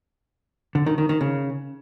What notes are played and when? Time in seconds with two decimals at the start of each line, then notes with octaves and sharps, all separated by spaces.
0.75 D3
0.86 D#3
0.98 D#3
1.09 D#3
1.21 C#3